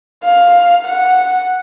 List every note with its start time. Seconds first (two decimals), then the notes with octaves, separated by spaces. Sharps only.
0.25 F5
0.85 F#5